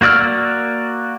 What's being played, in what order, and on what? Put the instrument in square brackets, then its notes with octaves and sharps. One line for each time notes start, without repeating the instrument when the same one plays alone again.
[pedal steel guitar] A#3 F#4 D5 E6 F6